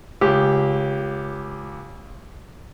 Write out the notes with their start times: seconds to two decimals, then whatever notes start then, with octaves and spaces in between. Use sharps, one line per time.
0.21 C#2 G4